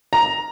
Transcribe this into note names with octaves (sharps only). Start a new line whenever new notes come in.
A#5